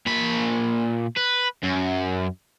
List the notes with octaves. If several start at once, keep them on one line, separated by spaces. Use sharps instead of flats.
A#2 B5
B4
F#2